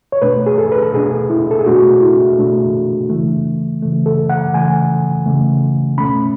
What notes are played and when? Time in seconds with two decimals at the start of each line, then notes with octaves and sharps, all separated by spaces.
0.12 C#5
0.22 B2 A3 D4 B4
0.46 G#4
0.58 A4
0.72 B4
0.82 A4
0.93 B2 A3 D4 G#4
1.30 E4
1.51 A4
1.59 G#4
1.66 B2 A3 D4 F#4
2.01 E4
2.39 B2 A3 D4
3.10 C#3 E3 A3
3.82 C#3 E3 A3
4.06 A4
4.30 F#5
4.54 C#3 E3 A3 G#5
5.26 C#3 E3 A3
5.98 B2 A3 C#4 B5